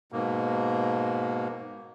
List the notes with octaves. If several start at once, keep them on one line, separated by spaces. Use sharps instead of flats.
G#2 B2 A#3